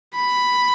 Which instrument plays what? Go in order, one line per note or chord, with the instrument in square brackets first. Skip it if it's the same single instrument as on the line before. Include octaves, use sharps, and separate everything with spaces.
[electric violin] B5